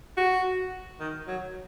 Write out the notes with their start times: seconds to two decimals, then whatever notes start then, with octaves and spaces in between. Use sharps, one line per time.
0.17 F#4
1.00 D#3
1.28 F#3